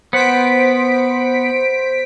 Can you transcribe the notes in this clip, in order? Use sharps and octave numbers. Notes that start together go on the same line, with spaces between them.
B3 C5 F#5 B6 D7